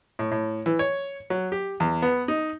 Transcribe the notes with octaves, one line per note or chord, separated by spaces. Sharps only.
A2
A2
E3
C#5
F#3
G4
E2
B3
D#4